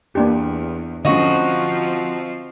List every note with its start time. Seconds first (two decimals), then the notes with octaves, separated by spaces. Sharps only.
0.15 E2 A#3 D4 G4
1.05 D3 F3 C4 C#4 D#4 F4 F#4